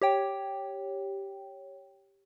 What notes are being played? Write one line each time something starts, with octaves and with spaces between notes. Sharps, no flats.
G4 C#5 G5